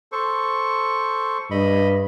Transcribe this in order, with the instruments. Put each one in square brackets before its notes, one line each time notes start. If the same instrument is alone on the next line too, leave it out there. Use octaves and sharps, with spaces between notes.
[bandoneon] A4 C5 C#6
[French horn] G2 [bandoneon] D#5 B5